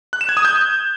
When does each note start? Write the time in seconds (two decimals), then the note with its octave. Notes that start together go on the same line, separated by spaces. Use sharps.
0.13 F#6
0.21 E7
0.29 G#6
0.37 D#6
0.45 G6